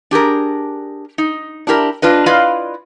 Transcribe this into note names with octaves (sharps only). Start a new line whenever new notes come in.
D4 G4 G#4 A#4
D#4
D4 E4 G4 A#4
D4 F4 B4 D#5
E4 F4 B4 D5 D#5 F5